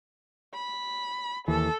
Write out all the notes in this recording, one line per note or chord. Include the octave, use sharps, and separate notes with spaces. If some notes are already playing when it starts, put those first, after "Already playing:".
B5
D#2 E3 A4